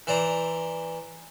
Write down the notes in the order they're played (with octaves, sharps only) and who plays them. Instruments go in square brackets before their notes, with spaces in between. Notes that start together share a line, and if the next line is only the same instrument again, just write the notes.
[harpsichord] E3 C5 D5 A#5